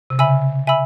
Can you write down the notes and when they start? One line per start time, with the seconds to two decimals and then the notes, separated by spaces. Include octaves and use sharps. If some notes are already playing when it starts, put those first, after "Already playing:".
0.10 C3
0.19 C#3 E5 G#5 B5 E6
0.67 E5 G#5 B5 E6